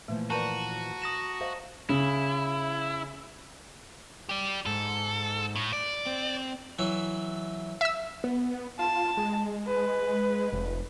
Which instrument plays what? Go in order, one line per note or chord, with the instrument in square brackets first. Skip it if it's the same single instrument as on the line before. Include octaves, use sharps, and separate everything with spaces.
[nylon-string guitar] A#2 E3 F3 [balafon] A3
[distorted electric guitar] F#4 [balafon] A#4 B4 D5 [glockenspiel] A5 A#5 D#7
[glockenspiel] D#6 A#6 E7
[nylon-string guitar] C5 D#5 F5
[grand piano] C#3 [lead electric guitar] E4
[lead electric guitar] G4 D5
[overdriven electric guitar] G#2 [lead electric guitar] A4
[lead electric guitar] A2
D5
[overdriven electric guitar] C4
[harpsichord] E3 F#3 E4
[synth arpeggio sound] E5 E6
[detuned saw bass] B3
[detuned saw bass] F4 [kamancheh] A5
[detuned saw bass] G#3
[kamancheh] B4
[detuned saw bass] F1